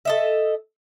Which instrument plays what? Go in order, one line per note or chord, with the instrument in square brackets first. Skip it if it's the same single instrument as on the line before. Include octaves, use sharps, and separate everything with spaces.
[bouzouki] A4 D#5 E5